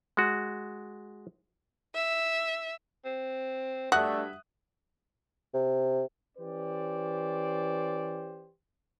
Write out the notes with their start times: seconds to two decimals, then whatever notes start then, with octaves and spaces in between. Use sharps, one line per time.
0.17 G#3 F#4
1.95 E5
3.05 C4
3.92 G2 A3 D4 F#4 E5 D#6 F#6
5.54 C3
6.38 E3 C#4 G4 B4 C5 D5